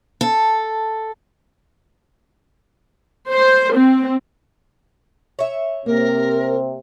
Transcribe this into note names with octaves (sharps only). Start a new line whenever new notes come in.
A4
C5
C4
C#5 E5
C3 A#3 A#4